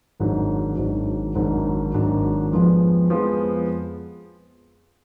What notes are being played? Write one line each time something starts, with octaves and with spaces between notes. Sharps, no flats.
G#1 G#2 F#3 D4
G#1 G#2 F#3 D4
G#1 G#2 F#3 D4
G#1 G#2 F#3 D4
F2 F3 G#3 B3
F2 F3 G#3 B3